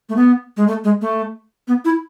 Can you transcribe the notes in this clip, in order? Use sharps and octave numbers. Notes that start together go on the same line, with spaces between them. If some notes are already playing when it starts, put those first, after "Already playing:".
A3
B3
G#3
A3
G#3
A3
B3
E4